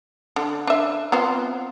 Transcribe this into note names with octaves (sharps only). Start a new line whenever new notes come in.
D3
D4 E5
B3 C4 F4